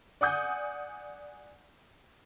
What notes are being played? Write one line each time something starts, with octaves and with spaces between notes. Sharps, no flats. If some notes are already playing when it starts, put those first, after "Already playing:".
D5 F#5 G#5 D#6 G6